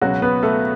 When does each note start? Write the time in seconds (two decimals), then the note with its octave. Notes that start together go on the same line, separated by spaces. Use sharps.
0.01 C#2 B2 F#3 F#4
0.22 B3 B4
0.43 A3 A4